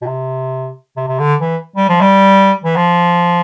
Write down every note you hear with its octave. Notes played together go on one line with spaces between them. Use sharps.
B2
C3
C3
C3
D3
E3
G3
F3
G3
E3
F3